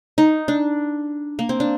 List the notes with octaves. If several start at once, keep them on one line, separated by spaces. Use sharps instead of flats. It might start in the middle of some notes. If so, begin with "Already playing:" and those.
D#4
D4
A#3
C4
D4